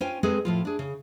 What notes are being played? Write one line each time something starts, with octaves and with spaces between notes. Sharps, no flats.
C#4 F4 C5 G5 G#5
G#3 C4 G#4 A4 B4
A2 F3 F4
D4 G#4
C#3